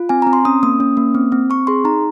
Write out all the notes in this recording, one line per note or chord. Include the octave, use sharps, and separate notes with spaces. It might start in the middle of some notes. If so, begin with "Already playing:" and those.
Already playing: F4
C4 G#5
C4 A#5
C6
C#4 D#6
A#3 D#6
C#4
A#3
C4
C4
C4 C#6
G#4 C6
D#4 A#5